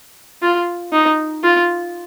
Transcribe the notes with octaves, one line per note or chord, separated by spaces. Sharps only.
F4
D#4
F4